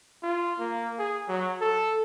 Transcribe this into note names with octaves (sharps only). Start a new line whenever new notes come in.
F4
A#3
G#4
F#3
A4